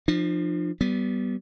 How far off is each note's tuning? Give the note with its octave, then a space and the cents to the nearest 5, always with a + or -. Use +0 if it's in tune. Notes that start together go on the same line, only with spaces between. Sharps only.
F3 +0 D4 +45
G3 -25 B3 +0